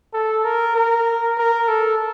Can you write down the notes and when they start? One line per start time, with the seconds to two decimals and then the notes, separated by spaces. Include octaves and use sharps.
0.14 A4
0.45 A#4
0.76 A#4
1.38 A#4
1.68 A4